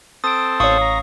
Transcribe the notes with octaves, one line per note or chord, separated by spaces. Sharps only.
C4 A4 D#6 D7
A1 C#5 F5 C#6 D#6
A#5